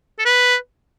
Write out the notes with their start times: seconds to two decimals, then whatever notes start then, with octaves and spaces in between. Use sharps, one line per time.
0.19 A4
0.25 B4